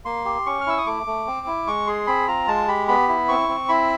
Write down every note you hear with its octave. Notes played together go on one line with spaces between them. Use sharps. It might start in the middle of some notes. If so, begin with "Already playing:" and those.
A#3 C6
G4
C#4 C#6
F6
E4 E6
D#6
A3 D6
A3
C4
E4
G#3 C#6
G#4 C6
C4 B5
F4 A#5
G#3 A5
G4 B5
B3 B5
E4
C4 C#6
C4
E4 B5